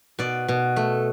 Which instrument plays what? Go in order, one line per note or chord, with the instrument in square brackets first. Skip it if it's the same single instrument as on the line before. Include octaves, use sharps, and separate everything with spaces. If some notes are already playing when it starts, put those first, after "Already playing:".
[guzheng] B2 D5
B2
A3